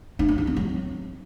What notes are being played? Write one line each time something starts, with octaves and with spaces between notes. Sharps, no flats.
D#4
D4
E4
C4
F#3